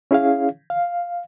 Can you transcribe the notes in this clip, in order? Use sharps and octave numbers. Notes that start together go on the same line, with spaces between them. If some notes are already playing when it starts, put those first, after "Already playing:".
C#4 E4 G#4 C#5 F5
F5